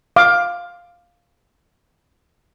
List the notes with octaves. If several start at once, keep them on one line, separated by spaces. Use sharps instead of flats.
F5 D6